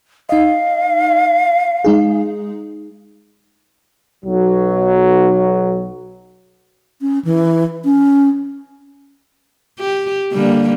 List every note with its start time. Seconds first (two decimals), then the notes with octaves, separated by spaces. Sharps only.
0.29 D#4 D#5 F5
1.85 G#3 D#4 G#4
4.25 B1 F#3
7.01 C#4
7.25 E3
7.85 C#4
9.79 G4
10.32 D3 G3 A#3